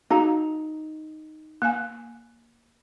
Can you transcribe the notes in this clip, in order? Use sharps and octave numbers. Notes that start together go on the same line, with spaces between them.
D#4 F#4 G#4 F5 A#5
A#3 F5 G#5